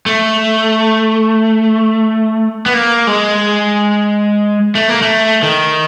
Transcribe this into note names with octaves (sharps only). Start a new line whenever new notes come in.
A3
B3
A#3
G#3
A3
A#3
A3
D#3